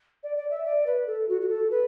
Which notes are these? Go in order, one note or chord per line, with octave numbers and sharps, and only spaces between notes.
D5
D5
E5
D5
B4
A4
F#4
F#4
A4
B4